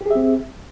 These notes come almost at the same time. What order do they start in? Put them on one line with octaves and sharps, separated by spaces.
G4 G#4 E5 C4